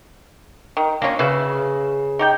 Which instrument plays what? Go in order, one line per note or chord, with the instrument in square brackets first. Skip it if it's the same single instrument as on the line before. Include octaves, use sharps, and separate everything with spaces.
[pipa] D#3
[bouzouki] A#3 C#4 [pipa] D4 F4
[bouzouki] C#3 [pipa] F#4 B4 E5
[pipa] D#4 G4 G5